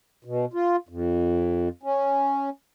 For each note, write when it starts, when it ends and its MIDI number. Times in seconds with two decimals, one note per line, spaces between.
0.25 0.45 47
0.53 0.76 65
0.89 1.69 41
1.83 2.50 61